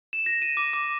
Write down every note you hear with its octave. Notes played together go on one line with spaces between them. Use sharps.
E7
A#6
D#7
D6
D6